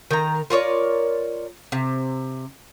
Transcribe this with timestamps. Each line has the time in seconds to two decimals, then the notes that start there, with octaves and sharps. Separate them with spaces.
0.11 D#3 A#5
0.50 F4 A#4 C#5 D5
1.72 C3